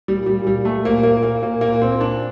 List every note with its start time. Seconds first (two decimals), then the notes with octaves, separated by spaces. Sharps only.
0.08 G3
0.14 A#2
0.26 G3
0.39 A#2
0.47 G3
0.65 A#2 A3
0.85 A#3
0.91 A#2
1.03 A#3
1.17 A#2
1.23 A#3
1.43 A#2 A#3
1.61 A#3
1.68 A#2
1.82 C4
1.94 A#2
2.01 D4